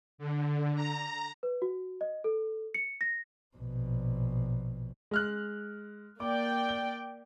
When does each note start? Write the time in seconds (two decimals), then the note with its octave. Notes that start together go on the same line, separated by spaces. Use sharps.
0.18 D3
0.75 A#5
1.43 B4
1.62 F#4
2.01 D#5
2.24 A4
2.74 C#7
3.01 A#6
3.57 A#1 B2
5.11 G#3 F6 F#6
6.20 A#3 D5 G5 D6
6.69 G7